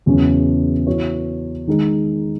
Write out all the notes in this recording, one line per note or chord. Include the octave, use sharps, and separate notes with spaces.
E2 C#3 F#3 C#4
E3 B3 F#4 C#5
D#3 G#3 D#4 G#4